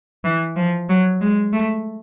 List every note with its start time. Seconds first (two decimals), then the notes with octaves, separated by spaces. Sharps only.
0.24 E3
0.56 F3
0.89 F#3
1.21 G#3
1.53 A3